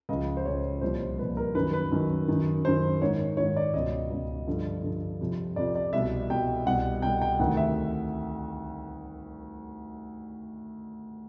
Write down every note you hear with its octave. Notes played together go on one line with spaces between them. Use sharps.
C#2 C#3 F3 D#5
C5
C#2 C#3 F3 C#5
C2 A#2 F3 C5
C2 A#2 F3 B4
A#4
F#2 D#3 B4
B4
F#2 D#3
F#2 D#3
F#2 D#3 C5
G#2 D#3 C#5
G#2 D#3 C#5
D5
C#2 B2 D#5
C#2 B2
G2 D3 F3
G2 D3 F3
F2 C3 F3
F2 C3 F3 D5
D5
C2 B2 E5
C2 B2 G5
C2 B2 F#5
C2 B2 G5
G5
D2 C3 D#3 F#5
E5